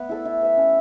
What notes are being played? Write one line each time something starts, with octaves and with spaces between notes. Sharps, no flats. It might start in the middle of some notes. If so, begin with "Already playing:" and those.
Already playing: A3 B3 B4
E4 A4 D5
E4
B4 E5
C#4